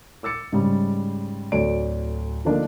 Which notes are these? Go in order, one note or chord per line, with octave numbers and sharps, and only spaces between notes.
D6 E6 A6 C#7
G#2 C#3 G3
D1 D2 A4 C#5 D5 D7
D3 F3 A3 A#3 D4 D#4